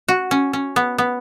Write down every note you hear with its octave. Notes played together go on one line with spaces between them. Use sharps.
F#4
C#4
C#4
B3
B3